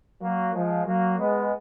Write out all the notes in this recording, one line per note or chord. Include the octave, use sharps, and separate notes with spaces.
F#3 A#3
F3 G#3
F#3 A#3
G#3 B3